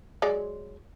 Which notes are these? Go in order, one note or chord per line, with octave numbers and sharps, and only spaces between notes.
F#3 G#3 D5